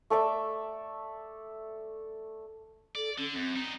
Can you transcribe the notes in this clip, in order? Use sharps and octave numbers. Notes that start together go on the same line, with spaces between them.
A3 A4 D5 E5
A4 D5
D3 C#4
F#2 C4
G3 D#4